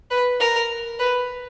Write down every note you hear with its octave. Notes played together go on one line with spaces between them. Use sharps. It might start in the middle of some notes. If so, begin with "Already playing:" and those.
B4
A#4
B4